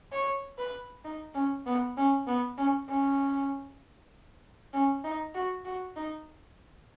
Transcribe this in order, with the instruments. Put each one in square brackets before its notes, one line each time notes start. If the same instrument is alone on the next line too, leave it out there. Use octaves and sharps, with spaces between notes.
[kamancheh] C#5
B4
D#4
C#4
B3
C#4
B3
C#4
C#4
C#4
D#4
F#4
F#4
D#4